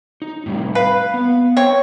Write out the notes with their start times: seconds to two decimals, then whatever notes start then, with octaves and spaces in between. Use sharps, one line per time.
0.22 D#4
0.46 A2 C3 G3
0.75 B4 F5
1.14 B3
1.57 C4 C#5